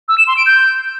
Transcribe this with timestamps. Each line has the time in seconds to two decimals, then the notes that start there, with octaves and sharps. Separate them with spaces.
0.09 E6
0.18 E7
0.27 C6
0.37 D7
0.46 G6